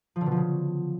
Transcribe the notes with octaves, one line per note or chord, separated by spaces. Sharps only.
F3
D3
B2
F3
C#3